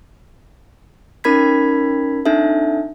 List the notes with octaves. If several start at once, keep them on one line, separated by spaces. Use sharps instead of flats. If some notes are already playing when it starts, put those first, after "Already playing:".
C#4 D#4 A#4 B5 G#6 B6
C4 D4 D#4 A4 E5